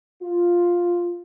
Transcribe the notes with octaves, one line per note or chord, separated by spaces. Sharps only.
F4